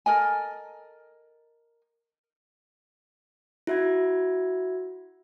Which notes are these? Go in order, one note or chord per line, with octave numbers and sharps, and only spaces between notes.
A4 A#4 D#5 G#5
E4 F#4 E5 B5 G#6